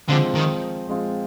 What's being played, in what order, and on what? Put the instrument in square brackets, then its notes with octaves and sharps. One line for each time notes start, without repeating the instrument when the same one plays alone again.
[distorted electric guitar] D3 [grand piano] F3 G#3 C4 F4
[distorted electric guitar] D#3
[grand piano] F3 G#3 C4 F4